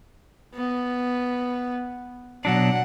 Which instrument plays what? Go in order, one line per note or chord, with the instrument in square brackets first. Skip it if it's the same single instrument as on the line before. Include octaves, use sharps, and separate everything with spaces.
[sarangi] B3
[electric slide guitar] B2 F#3 D4 [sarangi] F#5